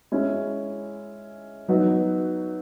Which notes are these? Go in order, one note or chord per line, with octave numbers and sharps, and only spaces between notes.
G#3 C#4 E4
F#3 B3 D#4 F#4